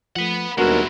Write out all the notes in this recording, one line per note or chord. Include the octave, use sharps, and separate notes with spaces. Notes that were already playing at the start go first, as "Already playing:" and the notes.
F3 A3 B4 F#5
D#2 G3 G#3 B3 D4 E4 F#4 A#4